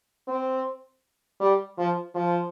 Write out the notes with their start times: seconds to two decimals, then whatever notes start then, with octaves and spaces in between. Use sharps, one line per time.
0.28 C4
1.40 G3
1.78 F3
2.15 F3